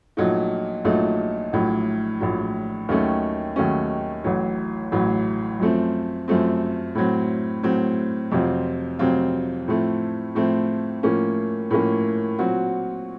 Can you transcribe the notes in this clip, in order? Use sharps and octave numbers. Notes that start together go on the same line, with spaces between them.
A#1 A#2 F#3 A3 D#4
A#1 A#2 F#3 A3 D#4
A#1 A2 F#3
A#1 A2 F#3
D#2 D#3 F#3 A3 C#4
D#2 D#3 F#3 A3 C#4
A1 A2 F#3
A1 A2 F#3
F#2 F3 A3 C4
F#2 F3 A3 C4
A2 F#3 C4
A2 F#3 C4
F2 C3 F#3 C4 F4
F2 C3 F#3 C4 F4
A2 F3 A3 C4
A2 F3 A3 C4
A2 F3 A#3 C#4
A2 F3 A#3 C#4
A#2 F#3 C4 F#4